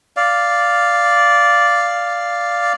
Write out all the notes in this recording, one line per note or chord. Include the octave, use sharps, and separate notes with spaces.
D5 F5